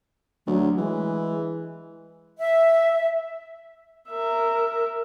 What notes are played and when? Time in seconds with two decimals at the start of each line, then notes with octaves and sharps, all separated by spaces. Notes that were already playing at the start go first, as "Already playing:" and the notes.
0.47 D2 F#3
0.78 E3 G#3
2.39 E5
4.10 A#4 E5